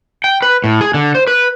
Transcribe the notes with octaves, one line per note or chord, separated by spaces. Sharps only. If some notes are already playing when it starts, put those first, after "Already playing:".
G5
B4
A2
G#4
D3
C5
B4